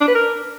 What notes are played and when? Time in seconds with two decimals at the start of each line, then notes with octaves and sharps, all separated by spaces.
0.01 D4
0.08 B4
0.15 A#4